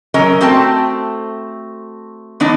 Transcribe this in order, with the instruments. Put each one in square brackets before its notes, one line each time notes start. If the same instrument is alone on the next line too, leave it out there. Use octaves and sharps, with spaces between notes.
[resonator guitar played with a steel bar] F#3 C#4 A#4 D#5
A3 C4 F#4 C5 G5 A5
D#3 B3 D4 D#4